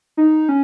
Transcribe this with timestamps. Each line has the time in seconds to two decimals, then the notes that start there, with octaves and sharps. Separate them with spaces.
0.17 D#4
0.49 C#4